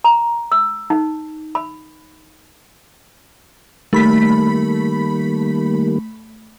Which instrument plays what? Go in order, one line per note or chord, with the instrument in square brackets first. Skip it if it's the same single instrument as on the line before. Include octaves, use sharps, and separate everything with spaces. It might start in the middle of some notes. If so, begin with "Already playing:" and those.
[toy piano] A#5
E6
D#4
B5
[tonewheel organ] D#3 G3 A#3 [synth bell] A3 B5 B6